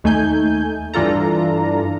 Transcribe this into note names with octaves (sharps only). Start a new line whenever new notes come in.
D#2 A3 D#4 G#5 G6
G2 E3 D4 F4 A4 A#5